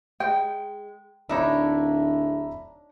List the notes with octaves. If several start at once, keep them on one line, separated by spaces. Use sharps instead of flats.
G#3 G5
D1 D4 D#4 C#5 E5 A#5 B5